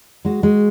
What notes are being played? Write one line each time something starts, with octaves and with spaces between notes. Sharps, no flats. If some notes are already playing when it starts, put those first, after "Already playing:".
G#3 F#4
G#3